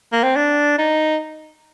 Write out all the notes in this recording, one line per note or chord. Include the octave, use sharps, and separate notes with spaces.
A#3
C4
D4
D#4